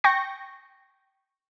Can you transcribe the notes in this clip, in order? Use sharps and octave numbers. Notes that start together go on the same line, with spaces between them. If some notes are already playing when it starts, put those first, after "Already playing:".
G5 C#6 G6 A#6